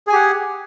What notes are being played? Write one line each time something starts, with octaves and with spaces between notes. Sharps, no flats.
G4 G#4 F#5 G#5